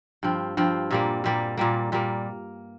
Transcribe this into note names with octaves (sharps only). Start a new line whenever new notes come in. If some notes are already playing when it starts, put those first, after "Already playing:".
G2 F3 C4
G2 F3 C4
A#2 G3 A#3
A#2 G3 A#3
A#2 G3 A#3
A#2 G3 A#3